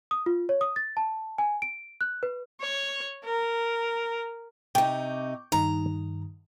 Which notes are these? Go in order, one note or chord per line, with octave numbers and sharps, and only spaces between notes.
D#6
F4
C#5
D#6
A6
A5
G#5
D7
F#6
B4
C#5
A#4
C3 D#4 G5 C#6 D6 G6
G2 D#3 D#4 A#5